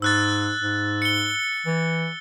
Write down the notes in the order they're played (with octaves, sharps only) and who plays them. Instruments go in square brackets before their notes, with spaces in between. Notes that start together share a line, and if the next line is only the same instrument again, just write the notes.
[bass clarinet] G#2 [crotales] E6 F#6 A6
[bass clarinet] G#2
[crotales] C#7 G7
[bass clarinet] E3